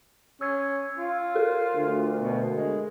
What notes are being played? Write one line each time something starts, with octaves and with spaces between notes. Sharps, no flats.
C#4 E6 G#6
F4
A4 A#4
D2
B2
G#3